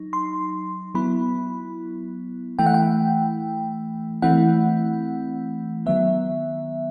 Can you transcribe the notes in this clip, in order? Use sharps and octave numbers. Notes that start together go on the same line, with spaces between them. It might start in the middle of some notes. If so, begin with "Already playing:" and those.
Already playing: F#3 D#4
C6
F#3 B3 E4 B5
E3 A3 E4 G5
F#5
G5
E3 A3 C4 E4 F#5
D#3 F#3 B3 E5